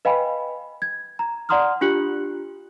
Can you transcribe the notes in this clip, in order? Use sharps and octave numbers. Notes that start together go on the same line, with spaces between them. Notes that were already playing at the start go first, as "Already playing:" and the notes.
B4 D#5 F5 G5 G#5 B5
G#6
A#5
D5 F#5 A#5 C6 D#6 F6
D4 F4 G4 F#6 C#7 F#7